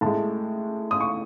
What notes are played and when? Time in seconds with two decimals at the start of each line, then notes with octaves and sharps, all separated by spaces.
0.01 A2 G#3 A5
0.91 D#6
1.00 C#6